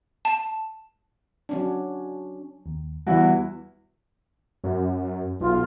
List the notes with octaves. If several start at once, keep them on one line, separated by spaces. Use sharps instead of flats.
A5
F#3 C#4 D4
D#2
E2 G3 E4 F#4 B4
F#2
B1 F4